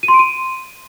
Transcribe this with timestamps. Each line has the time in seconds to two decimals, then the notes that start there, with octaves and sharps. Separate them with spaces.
0.03 D#7
0.08 C6
0.14 D7
0.19 D#7